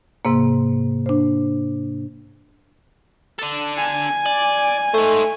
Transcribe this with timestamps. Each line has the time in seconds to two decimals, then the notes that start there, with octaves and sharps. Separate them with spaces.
0.25 G#2 C3 A#3
1.06 D4 C5
3.39 D4 A4
3.77 G#5
4.26 D5
4.94 A3 D#4 C5